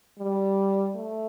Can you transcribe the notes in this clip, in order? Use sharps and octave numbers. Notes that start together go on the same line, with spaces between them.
G3
A3